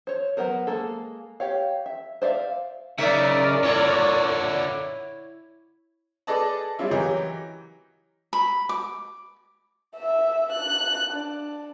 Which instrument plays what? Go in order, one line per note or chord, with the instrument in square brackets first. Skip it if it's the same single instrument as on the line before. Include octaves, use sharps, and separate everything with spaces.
[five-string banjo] C5 C#5
F#3 G#3 B3 A#4 C5
G#3 A#3 A4
G4 C#5 F5
E5
C5 D5 E5 F5
[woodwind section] A2 F#3 A3 [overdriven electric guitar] C#3 [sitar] D#4 E5 [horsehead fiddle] A#4 D5
[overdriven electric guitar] A#2 D3 [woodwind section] E4 [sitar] C#5
[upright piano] G#4 A4 B4 D5 D#5 A5
G3 G#3 C4 C#4 E4 F4
E3 F#3 G4 A#4 C#5 D#5
[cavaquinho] B5
D6
[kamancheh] E5
F#6
D4